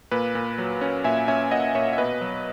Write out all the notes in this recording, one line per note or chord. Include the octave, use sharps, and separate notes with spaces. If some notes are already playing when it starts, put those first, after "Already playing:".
A#2 B4
A#2
F#3
C#4
A#2 E5 G#5
C#4 E5 G#5
A#2 D#5 F#5
A#2 C#5 E5
E5
B2 B4 D#5
F#3